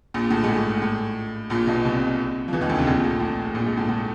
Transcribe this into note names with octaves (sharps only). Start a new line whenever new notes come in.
A#1 A#2
A2
G#2
A2
A2
A#1 A#2
B1 B2
C2 C3
F3
E2 E3
D#2 D#3
D2 D3
C2 C3
A#1 A#2
A2
A2
A#1 A#2
G#2
A2
A2